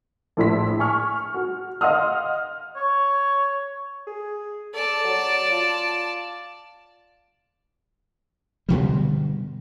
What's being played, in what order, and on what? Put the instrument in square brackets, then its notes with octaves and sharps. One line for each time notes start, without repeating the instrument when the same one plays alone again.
[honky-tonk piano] A#1 A2 E4 C6 B6
G#5 C#6 F6
F#4
D#5 F5 F#5 C6 D#6 F6
[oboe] C#5
[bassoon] G#4
[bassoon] A4 [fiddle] D5 A5
[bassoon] F#3
F4
[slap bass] G2 B2 D3 G3